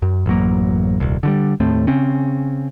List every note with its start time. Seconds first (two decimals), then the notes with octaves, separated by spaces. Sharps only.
0.02 F#2
0.26 A1 F#2 F#3 A#3
1.00 D#1 C2
1.23 D3 E3 G3
1.60 D#2 A2 A3 C4
1.87 C#3 C4 C#4